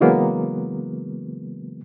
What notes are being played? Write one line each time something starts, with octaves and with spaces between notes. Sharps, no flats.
C#3 E3 F#3 G#3 A#3 B3